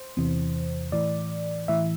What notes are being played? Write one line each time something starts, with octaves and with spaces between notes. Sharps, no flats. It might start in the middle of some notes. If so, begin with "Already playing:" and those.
Already playing: C5
E2 C3 E3
A2 E3 D5
A2 E3 E5